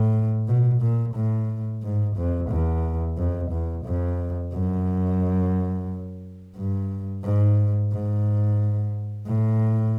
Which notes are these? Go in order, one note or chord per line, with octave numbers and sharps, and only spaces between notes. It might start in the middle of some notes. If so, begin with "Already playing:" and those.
Already playing: A2
B2
A#2
A2
G#2
F2
E2
F2
E2
F2
F#2
G2
G#2
G#2
A2